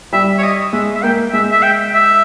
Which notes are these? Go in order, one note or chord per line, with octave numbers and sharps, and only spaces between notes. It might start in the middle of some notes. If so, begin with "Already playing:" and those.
G3 E5
C#5
D#5
G#3 E5
E5
A#3 G5
G#3 E5
E5
G5
E5